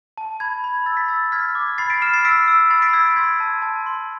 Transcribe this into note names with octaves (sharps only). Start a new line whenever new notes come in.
A5
B5 G#6
B5
E6 A6
B6
E6 A6
F6 G#6 B6
D6
B5 A6 C7
B6 D7
F6 C7 E7
A6 C7
E6 B6 D7
E6
B5 A6 C7
B6 D7
E6 G#6 B6
C6 G#6 B6
A5
A5
C6